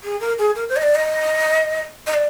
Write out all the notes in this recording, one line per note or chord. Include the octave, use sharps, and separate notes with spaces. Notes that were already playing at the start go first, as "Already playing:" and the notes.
G#4
A#4
G#4
A#4
C5
D#5
D5
D#5
D#5
D5